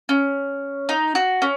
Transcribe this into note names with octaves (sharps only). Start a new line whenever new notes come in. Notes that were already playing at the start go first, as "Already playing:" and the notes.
C#4
D#4
F#4
C#4